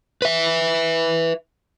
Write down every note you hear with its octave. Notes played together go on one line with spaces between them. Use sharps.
B4 E5